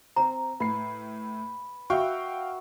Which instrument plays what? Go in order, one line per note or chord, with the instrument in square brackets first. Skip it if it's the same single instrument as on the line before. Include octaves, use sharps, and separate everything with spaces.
[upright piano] C4 [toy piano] A#5
[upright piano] A2 C7 [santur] B4
[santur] F#4 E5 [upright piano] F5 G5 C#6